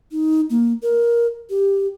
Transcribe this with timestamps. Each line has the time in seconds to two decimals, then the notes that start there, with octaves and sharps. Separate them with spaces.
0.11 D#4
0.50 A#3
0.82 A#4
1.50 G4